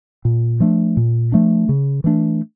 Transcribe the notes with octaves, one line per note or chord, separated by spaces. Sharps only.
A#2
F3 A3 D4
A#2
F3 A3 D4
C#3
E3 A3 D4